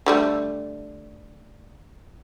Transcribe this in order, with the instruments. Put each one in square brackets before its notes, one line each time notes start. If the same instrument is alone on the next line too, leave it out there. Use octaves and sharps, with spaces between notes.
[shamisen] D3 G3 A3